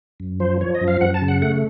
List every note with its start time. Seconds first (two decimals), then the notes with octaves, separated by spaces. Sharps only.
0.20 F#2
0.40 F3 C5
0.61 F3 C#5
0.75 D#5
0.81 F#2
0.88 F5
1.01 F#2 F#5
1.14 A5
1.22 C#3
1.28 F#5
1.42 A3 F#5